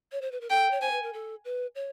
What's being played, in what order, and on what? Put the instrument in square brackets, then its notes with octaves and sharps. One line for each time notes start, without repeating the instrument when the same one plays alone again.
[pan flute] C#5
C5
B4
A#4
[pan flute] A4 [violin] G5
[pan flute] C#5
[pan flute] C5 [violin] G#5
[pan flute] B4
A#4
A4
B4
C#5